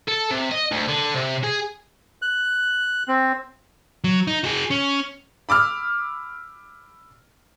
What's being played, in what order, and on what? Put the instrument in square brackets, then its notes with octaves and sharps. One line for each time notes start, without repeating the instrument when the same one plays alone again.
[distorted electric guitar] A4
C3
D#5
D2
D3
C3
G#4
[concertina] F#6
C4
[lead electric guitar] F#3
D#4
F#4 G#4
C#4
[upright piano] B5 D6 E6 F6